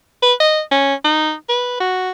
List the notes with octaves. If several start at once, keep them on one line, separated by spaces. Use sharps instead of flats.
B4
D#5
C#4
D#4
B4
F#4